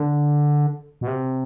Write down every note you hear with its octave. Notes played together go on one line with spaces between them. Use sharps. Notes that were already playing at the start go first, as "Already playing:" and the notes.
Already playing: D3
B2
C3